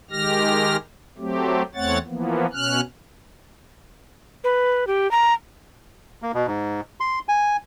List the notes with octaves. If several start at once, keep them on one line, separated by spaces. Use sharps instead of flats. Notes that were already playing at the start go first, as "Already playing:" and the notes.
D#3 G#3 G4 F6 A#6
F#3 A3 C4 G4
E2 A3 C4 C#5 F#5 A6
E3 F3 A#3 B3
B2 C#4 F6 F#6
B4
G4
A#5
A#3
B2
G#2
C6
G#5